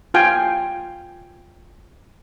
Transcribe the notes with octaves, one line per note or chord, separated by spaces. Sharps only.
F4 F5 G5 G#5